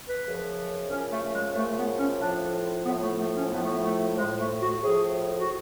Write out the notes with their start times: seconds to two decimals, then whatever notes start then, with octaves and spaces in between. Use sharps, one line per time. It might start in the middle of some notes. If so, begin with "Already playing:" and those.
0.08 B4
0.25 F#2 C#3 F3
0.89 F#2 C#3 F3 C#4
1.11 A3
1.33 G#3
1.55 F#2 C#3 F3 A3
1.77 B3
1.98 C#4
2.20 A2 F3 D4
2.86 A2 F3 B3
3.03 A3
3.19 A3
3.36 C#4
3.52 A2 F3 B3
3.63 A3
3.72 B3
3.84 A3
4.17 A2 F3 G#3
4.39 A3
4.61 F#4
4.83 A2 F3 G#4
5.39 F#4